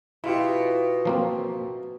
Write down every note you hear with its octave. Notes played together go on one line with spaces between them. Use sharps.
B2 E4 F4 G4
F3 A#3 C4